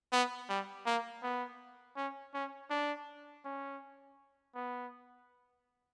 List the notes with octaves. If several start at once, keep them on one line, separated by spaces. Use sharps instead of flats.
B3
G3
A#3
B3
C#4
C#4
D4
C#4
B3